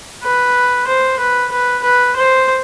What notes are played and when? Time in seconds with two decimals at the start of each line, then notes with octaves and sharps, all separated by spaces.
0.23 B4
0.87 C5
1.19 B4
1.51 B4
1.83 B4
2.16 C5